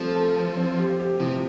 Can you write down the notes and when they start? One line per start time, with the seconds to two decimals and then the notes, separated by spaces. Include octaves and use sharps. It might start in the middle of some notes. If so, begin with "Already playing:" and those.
Already playing: F3 A3 C4
0.15 A4
0.36 A4
0.57 C4
0.78 G4
0.99 G4
1.20 C3 F3